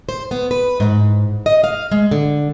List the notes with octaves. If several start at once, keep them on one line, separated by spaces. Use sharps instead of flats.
C5
B3
B4
G#2
D#5
F5
G#3
D3